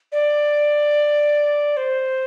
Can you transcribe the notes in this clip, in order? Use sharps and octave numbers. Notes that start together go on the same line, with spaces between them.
D5
C5